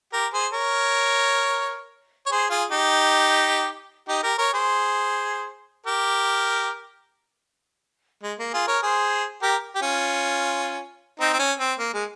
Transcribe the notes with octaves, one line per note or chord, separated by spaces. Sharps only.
G4 A#4
G#4 C5
A#4 C#5
C#5
G#4 C5
F4 G#4
D#4 G4
D#4 G4
G4 A#4
A#4 C#5
G#4 C5
G4 A#4
G#3
A#3
F4 G#4
A#4 C#5
G#4 C5
G4 A#4
G4
C#4 F4
C4 D#4
C4
C#4
C4
A#3
G#3